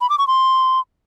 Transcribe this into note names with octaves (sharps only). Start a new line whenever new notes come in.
B5
D6
C#6
C6